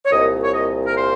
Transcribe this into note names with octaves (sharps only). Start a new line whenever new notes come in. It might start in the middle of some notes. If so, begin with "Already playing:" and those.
C#5
C2 A#2 D#5
C#5
D#5
A#4
C5